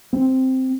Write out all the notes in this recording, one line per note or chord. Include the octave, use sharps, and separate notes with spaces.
C4